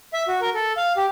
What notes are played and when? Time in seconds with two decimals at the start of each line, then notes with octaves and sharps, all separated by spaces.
0.14 E5
0.28 F#4
0.41 A#4
0.54 A4
0.77 F5
0.97 G4